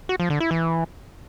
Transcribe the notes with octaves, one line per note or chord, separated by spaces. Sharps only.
F#4
F3
D3
E4
E3